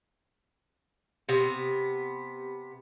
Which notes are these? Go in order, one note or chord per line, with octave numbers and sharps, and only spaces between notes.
C3 B3